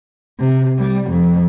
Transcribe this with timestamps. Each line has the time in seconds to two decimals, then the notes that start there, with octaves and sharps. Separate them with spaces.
0.40 C3
0.78 G3
1.10 F2